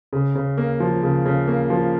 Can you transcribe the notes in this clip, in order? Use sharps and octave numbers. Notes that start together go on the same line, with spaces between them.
C#3
C#3
A#3
F3
C#3
C#3
A#3
F3